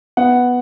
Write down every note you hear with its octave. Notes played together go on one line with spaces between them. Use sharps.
B3 F#5